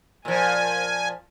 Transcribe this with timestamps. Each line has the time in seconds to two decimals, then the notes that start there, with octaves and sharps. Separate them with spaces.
0.25 A#2 F3 G#5